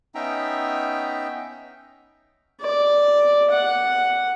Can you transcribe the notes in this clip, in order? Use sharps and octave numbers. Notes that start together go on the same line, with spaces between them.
B3 C#4 D#4 E5 G5 A#5
D5
F#5